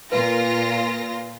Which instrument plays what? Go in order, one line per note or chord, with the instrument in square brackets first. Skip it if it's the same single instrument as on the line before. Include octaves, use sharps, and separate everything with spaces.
[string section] A#2 F4 A#6 [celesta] B4